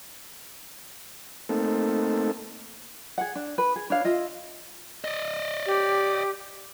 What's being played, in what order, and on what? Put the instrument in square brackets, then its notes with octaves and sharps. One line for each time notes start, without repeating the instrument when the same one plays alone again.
[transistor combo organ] A3 A#3 C4 D#4 A4
[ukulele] G#4 F#5
D4
B4
G#4
D4 C#5 F5
F4 D#5 E5
[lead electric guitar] D5 D#5
[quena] G4